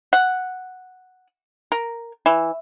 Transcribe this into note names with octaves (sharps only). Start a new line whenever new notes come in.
F#5
A#4
E3